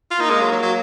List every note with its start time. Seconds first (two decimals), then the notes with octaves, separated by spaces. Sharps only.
0.11 F4
0.20 A#3 D#4
0.30 G#3
0.41 F#3
0.52 F#3
0.62 F#3